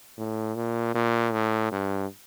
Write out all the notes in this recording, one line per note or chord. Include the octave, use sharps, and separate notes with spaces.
A2
A#2
A#2
A2
G2